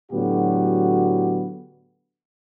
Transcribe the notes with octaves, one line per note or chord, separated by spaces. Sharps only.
A2 D3 F#3 B3 F#4 G4